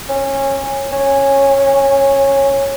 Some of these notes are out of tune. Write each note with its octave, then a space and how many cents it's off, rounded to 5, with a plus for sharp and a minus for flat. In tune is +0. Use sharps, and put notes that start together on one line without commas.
C#4 -20
C#4 -15